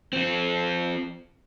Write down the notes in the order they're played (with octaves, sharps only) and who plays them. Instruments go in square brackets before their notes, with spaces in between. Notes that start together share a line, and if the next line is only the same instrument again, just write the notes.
[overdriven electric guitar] F3 C4